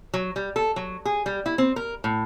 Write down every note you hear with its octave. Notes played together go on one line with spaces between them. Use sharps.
F#3
G3
A4
F#3
G#4
G3
E4
C4
A#4
A2